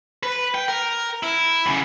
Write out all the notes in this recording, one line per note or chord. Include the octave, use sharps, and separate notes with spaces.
B4
G5
A#4
E4
E2 C#3